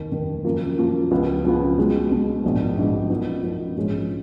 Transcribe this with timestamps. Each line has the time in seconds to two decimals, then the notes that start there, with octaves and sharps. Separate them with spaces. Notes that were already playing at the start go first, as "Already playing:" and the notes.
Already playing: F1 D#2 D#3
0.12 F1 D#2 D#3
0.44 F#2 F3 A#3 F4 A#4
0.77 F#2 F3 A#3 F4 A#4
1.11 C#2 C#3 F3 B3 F4
1.45 C#2 C#3 F3 B3 F4
1.77 B1 B2 G#3
2.11 B1 B2 G#3
2.44 A#1 G#2 F3 B3
2.77 A#1 G#2 F3 B3
3.10 F#2 F3 B3 D#4
3.43 F#2 F3 B3 D#4
3.77 A#1 G#2 F3 G#3 C#4